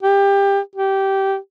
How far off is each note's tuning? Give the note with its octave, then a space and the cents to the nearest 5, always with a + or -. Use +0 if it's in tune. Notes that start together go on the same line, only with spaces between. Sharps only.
G4 +20
G4 -15